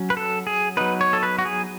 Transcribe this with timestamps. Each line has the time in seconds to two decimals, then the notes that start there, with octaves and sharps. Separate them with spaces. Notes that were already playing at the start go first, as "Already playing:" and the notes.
Already playing: F#3 C#4
0.10 B4
0.17 A4
0.47 G#4
0.77 F#3 B3 D#4 B4
1.01 C#5
1.13 A4
1.23 B4
1.39 F#4
1.45 G#4